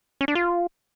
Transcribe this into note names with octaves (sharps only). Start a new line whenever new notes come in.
C#4
D4
F4